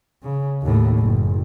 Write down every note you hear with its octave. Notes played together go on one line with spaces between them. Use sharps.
C#3
D#2 A2
F#1